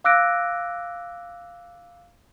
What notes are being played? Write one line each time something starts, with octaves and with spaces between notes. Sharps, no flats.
F5 D6 E6 F#6 A#6 D7